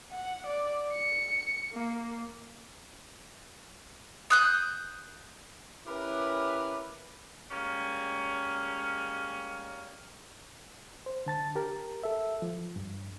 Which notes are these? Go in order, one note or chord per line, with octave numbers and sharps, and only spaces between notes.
F#5
D5
C#7
A#3
D#6 F#6 G6
C#4 E4 G4 A#4 B4
G3 G#3 A#3 C#4
C5
D3 A5 A6
G4 A#4
A4 E5
F3
G2